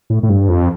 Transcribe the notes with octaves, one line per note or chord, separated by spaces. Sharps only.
A2
A2
G2
F2